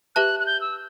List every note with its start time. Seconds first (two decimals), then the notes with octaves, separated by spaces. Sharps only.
0.15 G4 B4 E5 A5 F#6
0.40 F#6
0.46 G6
0.61 E6